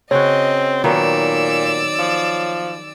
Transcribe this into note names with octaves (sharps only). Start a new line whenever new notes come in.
C#3 C4 F#4 C#5 D#5
A#2 D#3 F#3 B3 D5 E6
F3